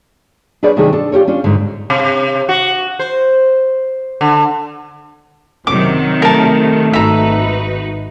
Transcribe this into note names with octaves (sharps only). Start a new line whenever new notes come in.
D4 G#4 A4 B4 C#5 D5
C3 D#3 A3 D4 G#4 A4
D4 A4
F4 G4 A#4 C#5
C#4 D4 F4
G#2 D3
C3
F#4
C5
D3
F#1 C3 D#3 F#3 D6
A3 A#4 A5
G#1 D#4 F#4 B4 E5 A#5